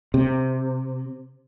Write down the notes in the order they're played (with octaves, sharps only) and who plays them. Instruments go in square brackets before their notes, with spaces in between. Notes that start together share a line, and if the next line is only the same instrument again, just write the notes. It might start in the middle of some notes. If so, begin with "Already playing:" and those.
[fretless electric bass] C3